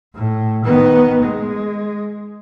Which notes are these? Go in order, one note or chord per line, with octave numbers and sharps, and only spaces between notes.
A2
D#3 B3
G#3